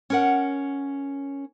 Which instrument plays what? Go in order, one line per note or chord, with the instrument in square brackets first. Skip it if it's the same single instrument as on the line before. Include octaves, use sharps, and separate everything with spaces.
[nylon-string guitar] C#4 A#4 F#5